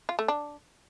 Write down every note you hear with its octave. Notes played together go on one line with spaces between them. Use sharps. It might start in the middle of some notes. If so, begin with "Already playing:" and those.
F4
A3
D4